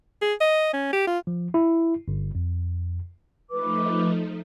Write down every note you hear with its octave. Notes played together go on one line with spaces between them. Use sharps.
G#4
D#5
C#4
G4
F4
F3
E4
G1
F2
F3 A3 D#4 B4 D6